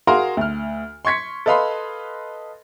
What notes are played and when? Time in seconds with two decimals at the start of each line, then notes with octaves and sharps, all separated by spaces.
0.07 F#4 G#4 A#4 F5 A#5 C6
0.37 D2 F6
1.05 C6 C#6 G#6 B6 C#7
1.46 A4 B4 D#5 F5 B5 C6